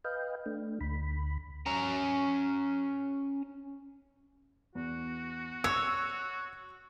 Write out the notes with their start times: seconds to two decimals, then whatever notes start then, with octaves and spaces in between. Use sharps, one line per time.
0.05 B4 D#5 F5 G5
0.46 A3 D4
0.81 D2 B5
1.66 C#4 A#5
4.75 E2 F#4
5.64 C#5 C#6 E6 F#6 C#7